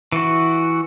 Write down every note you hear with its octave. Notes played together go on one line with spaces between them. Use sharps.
E3 F#4